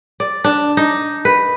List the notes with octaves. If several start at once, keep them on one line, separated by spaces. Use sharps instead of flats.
D5
D4
D#4
B4